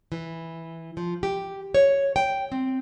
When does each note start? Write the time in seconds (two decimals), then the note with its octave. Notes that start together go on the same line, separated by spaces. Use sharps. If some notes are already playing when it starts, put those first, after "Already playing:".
0.12 E3
0.97 F3
1.23 G4
1.74 C#5
2.16 G5
2.52 C4